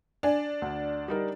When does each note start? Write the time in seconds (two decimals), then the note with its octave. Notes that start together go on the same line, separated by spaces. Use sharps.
0.23 D4 D5 G#5
0.62 D2
1.08 G3 D#4 A#4